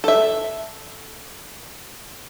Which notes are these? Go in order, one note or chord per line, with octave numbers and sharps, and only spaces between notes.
A4 E5